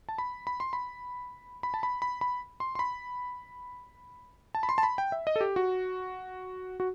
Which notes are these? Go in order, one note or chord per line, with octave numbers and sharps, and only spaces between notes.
A5
B5
B5
C6
B5
B5
A5
B5
B5
B5
C6
C6
B5
A5
B5
C6
A5
B5
G5
E5
D#5
A4
G4
F#4
F#4